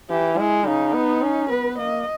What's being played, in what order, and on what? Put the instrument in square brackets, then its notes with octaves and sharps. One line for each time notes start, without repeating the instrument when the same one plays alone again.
[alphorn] E3 [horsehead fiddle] G4
[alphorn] G#3 [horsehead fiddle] E4
[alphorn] C#3 [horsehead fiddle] D#4
[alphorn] B3
C#4
[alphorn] B3 [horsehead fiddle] B4
[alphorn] A#3 [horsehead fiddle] D#5